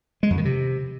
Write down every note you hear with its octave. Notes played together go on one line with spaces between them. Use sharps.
G#3
F2
D#3
C3